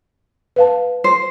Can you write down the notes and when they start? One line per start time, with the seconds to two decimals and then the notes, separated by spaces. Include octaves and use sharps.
0.56 B4 F5 A5
1.04 C5